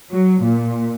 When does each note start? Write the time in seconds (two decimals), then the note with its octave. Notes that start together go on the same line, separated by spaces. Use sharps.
0.11 F#3
0.43 A#2